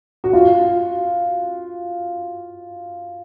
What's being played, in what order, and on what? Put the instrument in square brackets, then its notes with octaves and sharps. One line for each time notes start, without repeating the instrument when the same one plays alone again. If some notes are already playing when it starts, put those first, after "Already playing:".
[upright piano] F#4
F4